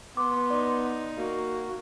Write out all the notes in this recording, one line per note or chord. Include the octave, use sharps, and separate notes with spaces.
B3 C6 D6
D#4 D5
A#3 F#4